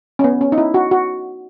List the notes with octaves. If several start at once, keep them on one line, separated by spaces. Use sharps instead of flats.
C#4
B3
C#4
D#4
E4
F#4
F#4